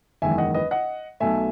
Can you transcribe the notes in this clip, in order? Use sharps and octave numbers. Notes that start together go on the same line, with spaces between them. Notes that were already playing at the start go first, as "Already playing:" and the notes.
F#1 E2 D#3 G#3 E5 G#5
D#5 F#5
B4 D#5
D#5 F#5
B1 B2 A3 E5 G#5